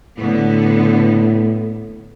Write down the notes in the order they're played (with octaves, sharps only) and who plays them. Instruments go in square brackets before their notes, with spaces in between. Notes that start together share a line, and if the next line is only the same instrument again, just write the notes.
[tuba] A2 [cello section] D3 B3